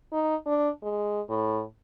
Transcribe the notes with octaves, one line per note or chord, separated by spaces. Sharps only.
D#4
D4
G#3
A2